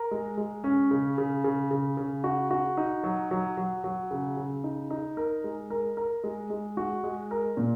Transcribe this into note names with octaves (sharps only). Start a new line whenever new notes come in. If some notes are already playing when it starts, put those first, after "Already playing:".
Already playing: A#4
G#3
G#3
C#4
C#3
C#3
C#3
C#3
C#3
F#4
F#4
D#4
F#3
F#3
F#3
F#3
C#3
C#3
D#4
D#4
A#4
G#3
A#4
A#4
G#3
G#3
F#4
G#3
A#4
A#2